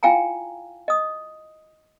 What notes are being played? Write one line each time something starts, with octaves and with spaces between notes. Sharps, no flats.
E4 F4 F5 G5 G#5 A#5
D#5 D#6